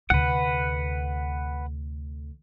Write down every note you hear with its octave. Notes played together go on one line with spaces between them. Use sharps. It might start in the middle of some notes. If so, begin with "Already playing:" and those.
D2 C3 B4 F#5